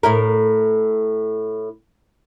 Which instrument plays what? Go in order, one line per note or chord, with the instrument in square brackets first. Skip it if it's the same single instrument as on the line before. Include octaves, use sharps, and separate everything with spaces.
[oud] A2 E4 A#4